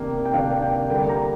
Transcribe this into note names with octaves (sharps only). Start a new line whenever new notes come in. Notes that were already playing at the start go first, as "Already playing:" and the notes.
Already playing: C3 D#3 A#3 D4
G5
C3 D#3 A#3 D4 F5
G5
D3 G3 A#3 G5
A#5